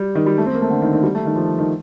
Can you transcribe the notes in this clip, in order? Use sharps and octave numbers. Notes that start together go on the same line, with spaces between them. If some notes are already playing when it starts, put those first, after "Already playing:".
Already playing: G3
D#3
G3
A3
C4
A#3
A3
D3
D#3
D#3
G3
A3
D#3
F3
D#3